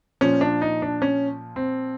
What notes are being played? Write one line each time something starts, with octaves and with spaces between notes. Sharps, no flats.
A#2 F3 C#4
D4
D#4
D4
C#4
C4